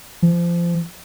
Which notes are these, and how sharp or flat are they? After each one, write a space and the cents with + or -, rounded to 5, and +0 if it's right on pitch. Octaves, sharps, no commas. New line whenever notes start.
F3 -25